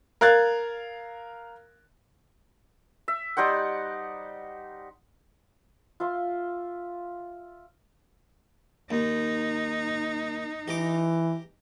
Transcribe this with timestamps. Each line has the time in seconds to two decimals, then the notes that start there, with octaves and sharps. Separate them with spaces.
0.21 A#4 F5 F#6 G#6 A6
3.08 E5
3.37 G3 D#4 C5 F#5
6.00 F4 E5 C6
8.91 D#2 D#4
10.68 E3 G4 A#5 D6